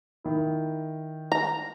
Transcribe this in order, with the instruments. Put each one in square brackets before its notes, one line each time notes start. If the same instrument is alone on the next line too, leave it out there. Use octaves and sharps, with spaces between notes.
[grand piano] D#3 E4
[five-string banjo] A#5